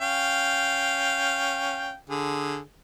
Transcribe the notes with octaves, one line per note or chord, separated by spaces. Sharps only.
C#4 F5 G5
D3 G#4